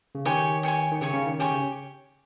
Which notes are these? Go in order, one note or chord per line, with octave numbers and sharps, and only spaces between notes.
C#3
D#3 G4 C#5 G#5 C#6
G4 C#5 G#5 C#6
D#3
C#3 G4 C#5 G#5 C#6
C#3
D#3
C#4 G4 C#5 G#5 C#6
C#3